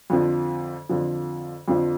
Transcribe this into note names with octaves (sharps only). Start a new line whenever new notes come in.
F2 D3 F3
F2 D3 F3
F2 D3 F3